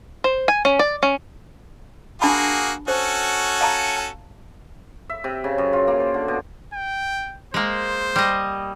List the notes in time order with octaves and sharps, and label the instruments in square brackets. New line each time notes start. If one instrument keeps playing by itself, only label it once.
[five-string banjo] C5
G#5
C#4
D5
C#4
[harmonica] A#3 F#4 G#4 [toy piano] D4 A5 B5
[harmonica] C#4 F#4 A4 [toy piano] C5
[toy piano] F5 A5 A#5
[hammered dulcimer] E5
C3
C#3
F#2
F4
A#3
C5
D3
B2
[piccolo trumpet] G5
[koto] G#3 A#3 [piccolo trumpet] C5
[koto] G3 D#5